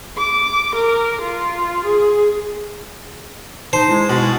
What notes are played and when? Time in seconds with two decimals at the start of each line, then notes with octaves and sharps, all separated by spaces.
0.17 D6
0.75 A#4
1.22 F4
1.85 G#4
3.73 D#4 C5 A5
3.89 G#3 E4
4.09 B2